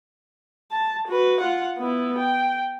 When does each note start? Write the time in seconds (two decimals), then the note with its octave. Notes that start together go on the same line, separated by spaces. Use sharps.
0.71 A5
1.08 F#4 B4
1.41 F4 F#5
1.78 B3 E4
2.18 G5